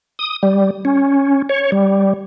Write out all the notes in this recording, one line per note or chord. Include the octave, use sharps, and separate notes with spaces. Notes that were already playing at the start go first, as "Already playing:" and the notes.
D#6
G3
C#4
C#5
G3